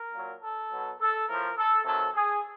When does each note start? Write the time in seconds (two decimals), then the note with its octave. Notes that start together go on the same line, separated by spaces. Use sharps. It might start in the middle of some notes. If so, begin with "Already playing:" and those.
Already playing: A#4
0.12 A#2 F#3
0.42 A4
0.70 B2 F#3
0.98 A4
1.27 A2 F3 A#4
1.56 A4
1.85 C3 D#3 F#3 A4
2.13 G#4